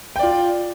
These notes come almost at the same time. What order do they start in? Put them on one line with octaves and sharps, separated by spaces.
G5 D5 F4